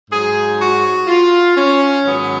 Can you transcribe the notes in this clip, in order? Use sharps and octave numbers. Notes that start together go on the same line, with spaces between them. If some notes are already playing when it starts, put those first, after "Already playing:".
G#2 F#3 G#4
F#4
F4
C#4
G#2 D#3 F#3 B3